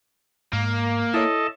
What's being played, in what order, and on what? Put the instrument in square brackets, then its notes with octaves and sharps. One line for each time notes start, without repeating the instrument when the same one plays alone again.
[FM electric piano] G#2 [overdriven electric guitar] A#3
[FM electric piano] E4 C#5 [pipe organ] A4 D#5 A5